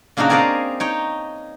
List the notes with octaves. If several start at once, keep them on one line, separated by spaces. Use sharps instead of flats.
A#2 C#3 A#3 D4 D#4 F#4
C4 G#4 A#4 D5 D#5 F5
D#4 C#5 G5